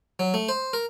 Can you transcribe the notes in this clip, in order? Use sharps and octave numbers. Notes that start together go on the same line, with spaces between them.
F#3
A3
C5
A#4